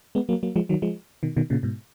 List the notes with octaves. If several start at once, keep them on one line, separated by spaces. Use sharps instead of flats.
G#3 B3
F#3 A#3
F#3 A#3
F3 G#3
D#3 F#3
F3 G#3
B2 D#3
B2 D#3
A#2 C#3
G#2 B2